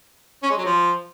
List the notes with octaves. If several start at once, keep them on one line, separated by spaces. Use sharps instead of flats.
C#4
G#3
F#3
F3